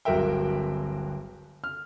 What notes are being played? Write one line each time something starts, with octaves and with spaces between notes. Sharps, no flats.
D1 G1 F#4 A#4 E5 G5
F6